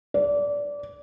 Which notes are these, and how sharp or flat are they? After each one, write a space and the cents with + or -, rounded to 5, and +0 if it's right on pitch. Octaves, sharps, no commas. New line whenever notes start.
D5 -20